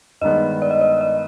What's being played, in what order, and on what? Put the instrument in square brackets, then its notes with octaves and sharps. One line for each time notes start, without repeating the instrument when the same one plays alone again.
[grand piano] G2 D#3 G#3 B3 [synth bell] D#5
[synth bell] D5
D#5
D5
D#5